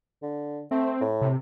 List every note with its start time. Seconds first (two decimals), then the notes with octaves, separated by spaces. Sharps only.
0.23 D3
0.71 A3 C4
1.01 A2
1.21 C3